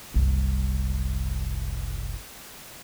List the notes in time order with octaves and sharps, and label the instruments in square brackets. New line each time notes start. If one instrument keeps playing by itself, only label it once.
[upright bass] F#1 C2